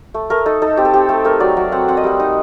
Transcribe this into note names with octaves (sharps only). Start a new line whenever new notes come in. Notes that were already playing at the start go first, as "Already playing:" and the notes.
A3
A3 A#4
D#4 A4
D#4 A4
C4 G4
A4
C4 G4
A3 A4
A3 A#4
F#3 D5
F#3
C4 F#5
C4 F#5
D#5
G3 F#5
D#4